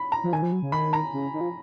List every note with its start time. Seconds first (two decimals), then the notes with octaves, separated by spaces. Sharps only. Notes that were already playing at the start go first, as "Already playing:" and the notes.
Already playing: B5
0.12 A#5
0.24 F3
0.33 D#3 G#5
0.42 F3
0.52 F#3
0.62 C#3
0.72 D#3 B5
0.93 A#5
1.13 C#3
1.33 D#3
1.41 F3